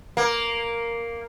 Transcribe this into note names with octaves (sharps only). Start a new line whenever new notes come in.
A#3